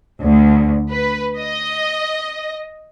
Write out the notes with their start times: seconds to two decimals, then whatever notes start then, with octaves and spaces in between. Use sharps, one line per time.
0.23 D2
0.90 B4
1.39 D#5